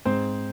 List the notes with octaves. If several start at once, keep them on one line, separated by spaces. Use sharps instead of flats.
G#2 C4 C5